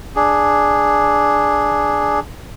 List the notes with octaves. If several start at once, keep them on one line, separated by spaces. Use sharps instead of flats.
D4 G#4